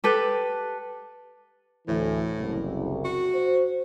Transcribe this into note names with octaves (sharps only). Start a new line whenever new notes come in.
G4 A4 B4
D2 A2 E3
F#1 C2
F#4
C5